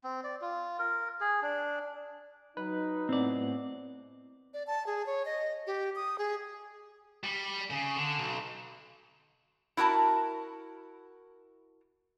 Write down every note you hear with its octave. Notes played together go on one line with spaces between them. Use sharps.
C4
D5
F4
A#4
G#4
D4
F#3 D#4 B4
A2 B3 C4 D5
D5
A5
G#4
C#5
D#5
G4
D#6
G#4
G3
C#3
D3
B1
E4 F#4 A#4 A5